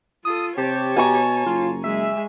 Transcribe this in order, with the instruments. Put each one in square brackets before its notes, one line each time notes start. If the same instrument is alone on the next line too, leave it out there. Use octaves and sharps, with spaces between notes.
[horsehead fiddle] F4 A4 [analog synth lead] D#6
[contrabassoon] C3 [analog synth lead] G4 [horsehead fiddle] C#5 A5
[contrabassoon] B2 [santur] G#5 A#5 C#6
[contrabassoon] F#1 [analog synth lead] F4
[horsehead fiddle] G#3 [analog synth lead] E5